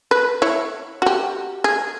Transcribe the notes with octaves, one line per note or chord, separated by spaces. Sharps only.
B4
E4 C#5
F#4 G4
G#4